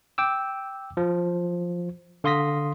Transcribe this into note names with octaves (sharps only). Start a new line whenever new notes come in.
G5 D6 E6
F3
D3 F5 C6 D#6 A#6 B6